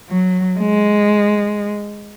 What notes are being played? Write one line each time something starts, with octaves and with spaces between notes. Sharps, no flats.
F#3
G#3